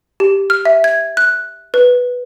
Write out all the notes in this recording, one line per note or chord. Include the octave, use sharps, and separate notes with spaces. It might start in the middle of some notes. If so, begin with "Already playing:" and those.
G4
F6
E5
G#6
F#6
B4